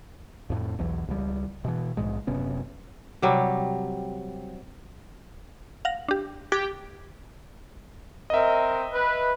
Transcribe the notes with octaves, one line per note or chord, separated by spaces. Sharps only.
F2 A2
B1 E2 E3
C#2 G3
B2 E3
A#1 G#2 G#3
F#1 C3 B3 C#4
C3 F#3 G3
F5 F#5 A#6
D4 G4
G4 F#6 G#6 A6
C4 A#4 D#5 E5
B4